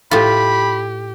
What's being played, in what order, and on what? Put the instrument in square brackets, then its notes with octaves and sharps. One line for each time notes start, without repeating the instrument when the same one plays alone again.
[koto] A2 F4 [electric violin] G4 [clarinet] B5